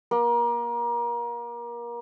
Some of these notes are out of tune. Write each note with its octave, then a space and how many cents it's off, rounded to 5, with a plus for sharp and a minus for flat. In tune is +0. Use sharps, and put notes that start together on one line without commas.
A#3 +30